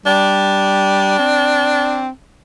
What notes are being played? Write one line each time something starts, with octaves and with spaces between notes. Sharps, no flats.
G3 D4
C4